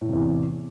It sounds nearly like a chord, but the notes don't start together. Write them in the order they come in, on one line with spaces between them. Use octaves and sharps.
A2 E3 C3 E2